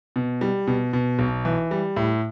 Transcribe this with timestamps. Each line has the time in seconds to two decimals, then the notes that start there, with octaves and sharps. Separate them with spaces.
0.16 B2
0.41 G3
0.67 B2
0.93 B2
1.19 B1
1.45 E3
1.71 G3
1.97 A2